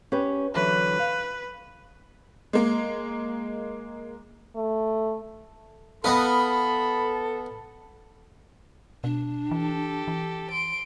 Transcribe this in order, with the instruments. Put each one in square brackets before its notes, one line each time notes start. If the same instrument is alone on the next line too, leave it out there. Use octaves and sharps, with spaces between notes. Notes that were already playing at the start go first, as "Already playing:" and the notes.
[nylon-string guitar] C#4 G4 B4
[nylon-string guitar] D3 E3 F#3 [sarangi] B4
[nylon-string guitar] F5
[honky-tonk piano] G#3 A#3
[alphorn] A3
[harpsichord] B3 D#5 F5 [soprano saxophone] A4 [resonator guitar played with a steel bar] B4 [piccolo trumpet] B5
[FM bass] B2 [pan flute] D4
[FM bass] E3 [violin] G4 A4
[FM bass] E3
[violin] C6 D7